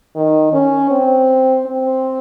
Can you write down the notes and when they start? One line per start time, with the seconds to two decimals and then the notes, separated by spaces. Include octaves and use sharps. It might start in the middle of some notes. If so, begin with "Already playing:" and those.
0.16 D#3
0.53 C#4
0.91 C4
1.66 C4